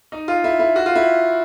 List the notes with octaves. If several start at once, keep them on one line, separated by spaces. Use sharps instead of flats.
D#4
F4
E4
E4
F#4
F4
E4